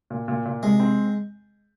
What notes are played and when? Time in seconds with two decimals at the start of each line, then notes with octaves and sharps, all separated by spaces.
0.10 A#2
0.28 A#2
0.45 A#2
0.63 C3 G#3
0.80 C4